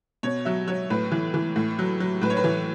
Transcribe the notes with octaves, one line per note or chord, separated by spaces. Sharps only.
B2 C#5
F#3 E5
F#3 C#5
A2 B4
E3
E3
A2
F#3
F#3
A2 B4
C#5
B4
E3